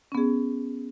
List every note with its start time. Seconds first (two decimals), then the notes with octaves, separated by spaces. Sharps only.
0.12 C#4
0.15 B3
0.17 G#4